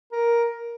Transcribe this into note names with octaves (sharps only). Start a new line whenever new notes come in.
A#4